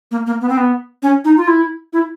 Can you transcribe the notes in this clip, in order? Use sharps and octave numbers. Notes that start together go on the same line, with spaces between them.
A#3
A#3
B3
C4
B3
C#4
D#4
F4
E4
E4